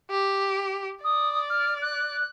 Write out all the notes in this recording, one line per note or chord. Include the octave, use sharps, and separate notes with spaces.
G4
D5 D#6
F6
F#6